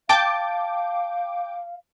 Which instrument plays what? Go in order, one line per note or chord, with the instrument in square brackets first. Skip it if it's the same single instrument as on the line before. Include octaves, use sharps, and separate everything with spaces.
[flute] F5 [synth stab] G5 D6 [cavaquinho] A5